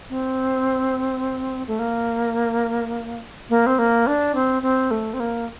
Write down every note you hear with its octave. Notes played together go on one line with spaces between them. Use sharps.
C4
A3
A#3
A#3
C4
A#3
D4
C4
C4
A3
C4
A#3